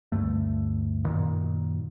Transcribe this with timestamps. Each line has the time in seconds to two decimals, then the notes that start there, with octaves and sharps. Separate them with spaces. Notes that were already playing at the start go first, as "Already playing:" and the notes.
0.12 D2 G2 A3
1.04 F#2 A#2 D#3